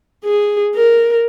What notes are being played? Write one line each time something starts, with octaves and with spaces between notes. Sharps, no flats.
G#4
A#4